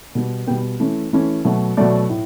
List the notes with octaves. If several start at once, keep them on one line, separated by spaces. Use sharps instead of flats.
B2 G3 B3
B2 G3 B3 G5
E3 A3 C#4
E3 A3 C#4
B2 F#3 A3
B2 F#3 A3 D5
A2